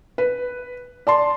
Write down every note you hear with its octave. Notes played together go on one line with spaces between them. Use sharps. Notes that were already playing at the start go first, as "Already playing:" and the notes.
B4
D5 A5 C6